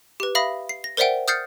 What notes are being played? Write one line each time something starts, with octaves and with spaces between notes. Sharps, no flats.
G4 B4
E5 F5 B5 D#6 A#6
C7
A#6
A#4 C5 D5 E5 F#5 G5
D#6 F6 G6 A6 C7 C#7